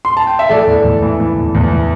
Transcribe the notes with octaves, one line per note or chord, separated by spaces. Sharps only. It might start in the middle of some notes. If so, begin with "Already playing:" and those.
C6
A5
G5
E5
E3 A4 D5
E2
E2
E3
E3
E2
E2
E3